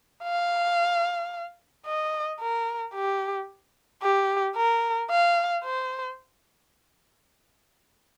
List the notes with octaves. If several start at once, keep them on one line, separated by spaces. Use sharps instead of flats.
F5
D#5
A#4
G4
G4
A#4
F5
C5